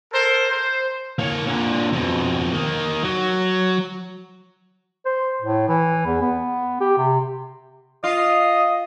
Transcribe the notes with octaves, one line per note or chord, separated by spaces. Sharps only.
A4 A#4 C5
C5
A#3 C#5
A#2 D3
F2 B2
D#3 A#3
F#3
C5
A2
E3
E2
B3
G4
C3
F4 D#5